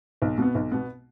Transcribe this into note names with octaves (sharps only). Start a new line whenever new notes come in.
B1
B2 B3
B1
B2 B3